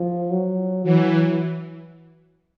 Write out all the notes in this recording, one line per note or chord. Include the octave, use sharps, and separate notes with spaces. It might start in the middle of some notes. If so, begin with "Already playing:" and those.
Already playing: F3
F#3
E3 F#3